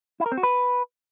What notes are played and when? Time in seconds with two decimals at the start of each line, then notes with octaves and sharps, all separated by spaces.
0.20 E4
0.26 A#4
0.32 C4
0.37 F#4
0.43 B4